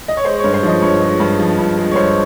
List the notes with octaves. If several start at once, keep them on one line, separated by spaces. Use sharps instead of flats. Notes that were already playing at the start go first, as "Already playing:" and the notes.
D#5
C#5
G#3 C5
G2 C#5
C5
F3 D#5
G2 C#5
G#3
G2
F3
G2
G#3
C#5
G2 C5